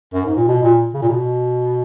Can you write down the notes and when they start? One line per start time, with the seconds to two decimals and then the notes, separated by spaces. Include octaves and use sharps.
0.14 F#2
0.26 G#2
0.37 A#2
0.48 B2
0.63 A#2
0.94 C#3
1.02 A#2
1.09 B2